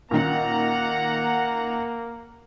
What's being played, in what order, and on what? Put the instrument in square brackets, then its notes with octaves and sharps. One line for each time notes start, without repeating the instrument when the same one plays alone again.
[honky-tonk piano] A#2 D#3 C#4 [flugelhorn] A#3 [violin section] F#5 A#5